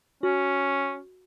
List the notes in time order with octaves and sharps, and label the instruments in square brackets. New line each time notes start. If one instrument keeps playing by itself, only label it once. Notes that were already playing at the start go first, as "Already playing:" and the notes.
[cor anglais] C#4 [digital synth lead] F#4